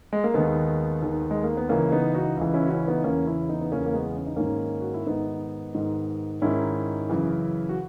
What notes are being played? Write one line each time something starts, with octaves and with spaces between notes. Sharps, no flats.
G#3
A#3
D#2 D#3 G#3 B3
D#2 D#3
G#3
A#3
B3
C#2 C#3 E3 A#3 C#4
B3 D#4
D#4 F#4
C#2 C#3 E3
C#4 E4
F#4
C#4 E4
B3 D#4
E2 C#3 E3 A#3 C#4
C#4 E4
B3 D#4
B3
E2 C#3 E3 A#3 C#4
A#3
G#3 B3
C#4
D#4
G#2 D#3 A#3 C#4
F#4
E4
G#2 D#3 B3 D#4
G#2 D#3
G#2 D#3 C#4 E4
F#2 C#3 E3
F#4